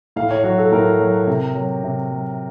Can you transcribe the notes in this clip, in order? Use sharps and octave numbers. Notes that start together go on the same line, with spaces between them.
A2 F5
C#5
F#3 F#4
A4
A2 A#4
F#3
C3
F#3
C3
F#3